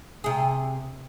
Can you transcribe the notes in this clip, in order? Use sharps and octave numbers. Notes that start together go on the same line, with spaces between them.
C3 G#4